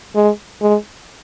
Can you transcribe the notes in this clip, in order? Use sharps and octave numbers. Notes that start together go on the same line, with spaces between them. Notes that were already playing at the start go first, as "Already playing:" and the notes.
G#3
G#3